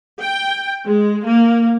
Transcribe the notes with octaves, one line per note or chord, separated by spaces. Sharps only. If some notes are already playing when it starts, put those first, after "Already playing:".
G5
G#3
A#3